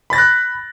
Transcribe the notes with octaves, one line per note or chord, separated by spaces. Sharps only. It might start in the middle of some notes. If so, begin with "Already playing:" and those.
B5 F#6 A6 A#6